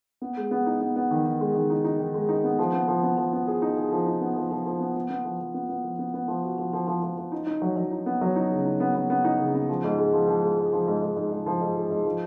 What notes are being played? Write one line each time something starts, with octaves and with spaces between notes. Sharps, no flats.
B3
G#3
B3
D#4
B3
B3
D#3
D#3
G#3
D#3
D#4
D#4
D#3
G#3
D#4
B3
F3
B3
F3
B3
F3
B3
G#4
D#4
G#4
F3
D#4
B3
F3
F3
F3
B3
B3
B3
F3
F3
B3
B3
F3
B3
B3
F3
F#4
F3
F3
F3
F3
F3
D#4
D#4
F#3
F#3
D#4
B3
F#3
D#4
C#3
D#4
B3
B3
B3
D#4
C#3
B3
F3
G#2
G#3
F3
F3
G#3
G#2
F3
G#2
G#2
G#2
G#2
F3
G#2
G#3
G#2
F3